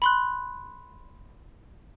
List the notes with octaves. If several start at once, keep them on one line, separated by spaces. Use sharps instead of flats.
B5 C6 F#6